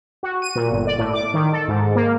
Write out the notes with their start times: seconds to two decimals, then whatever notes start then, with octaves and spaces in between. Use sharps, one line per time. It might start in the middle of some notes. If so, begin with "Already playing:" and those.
0.23 F#4
0.42 D#7
0.55 A#2
0.72 G1
0.87 D5
0.98 A2
1.13 D6
1.34 D#3
1.52 A4
1.68 G#2
1.95 A#3